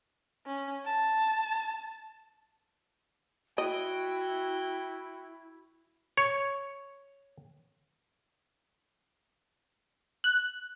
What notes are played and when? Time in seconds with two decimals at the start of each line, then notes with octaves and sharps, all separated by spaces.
0.46 C#4
0.85 A5
3.58 E4 F#4 D#5 G5
6.17 C#5
10.24 F#6